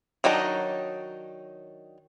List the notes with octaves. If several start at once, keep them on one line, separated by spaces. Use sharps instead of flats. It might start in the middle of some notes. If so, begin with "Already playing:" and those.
D#3 F#3 D4 D#4